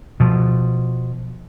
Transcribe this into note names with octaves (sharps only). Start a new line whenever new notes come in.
B2 F3